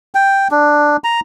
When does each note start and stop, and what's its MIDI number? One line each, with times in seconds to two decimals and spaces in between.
0.15 0.48 79
0.51 0.97 62
1.04 1.20 82